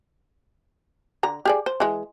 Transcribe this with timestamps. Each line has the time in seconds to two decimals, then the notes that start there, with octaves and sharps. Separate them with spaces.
1.23 D3 A#5
1.45 G4 G#4 D5
1.66 C5
1.80 E3 G#3